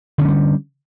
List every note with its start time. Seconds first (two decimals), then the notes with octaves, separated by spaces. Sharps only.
0.18 D3
0.22 C#4
0.25 F#3
0.28 G3